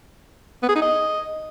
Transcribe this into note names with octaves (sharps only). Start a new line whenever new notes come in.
B3
G#4
D#4
D#5